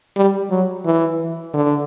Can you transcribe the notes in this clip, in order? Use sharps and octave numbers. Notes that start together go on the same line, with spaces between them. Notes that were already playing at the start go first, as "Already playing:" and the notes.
G3
F#3
E3
D3